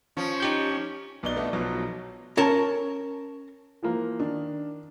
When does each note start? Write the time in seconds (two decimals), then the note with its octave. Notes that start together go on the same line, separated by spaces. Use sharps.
0.17 F3 C#4
0.40 D#4 G4 G6
1.23 B1 B2 D5 D#5 G7
1.36 A3 B3 D4 D#4
1.53 B1 B2 F3 F#3
2.37 C#4 A#4 A5
3.83 E3 F3 A#3
4.20 D#3 D4